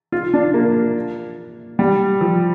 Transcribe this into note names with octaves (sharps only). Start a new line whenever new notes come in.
F4
D4
A#3
G3
F3